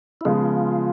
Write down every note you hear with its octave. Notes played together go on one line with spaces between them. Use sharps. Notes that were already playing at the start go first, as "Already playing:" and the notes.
E4
C#3 F3 G#3 B3 F4